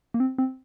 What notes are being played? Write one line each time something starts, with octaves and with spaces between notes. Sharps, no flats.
A#3
C4
C4